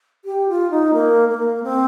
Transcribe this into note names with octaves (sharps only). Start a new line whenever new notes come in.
G4
F4
D#4
A#3
A#3
C4